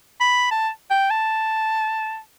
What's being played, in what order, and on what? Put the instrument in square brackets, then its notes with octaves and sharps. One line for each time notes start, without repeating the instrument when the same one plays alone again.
[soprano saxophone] B5
A5
G5
A5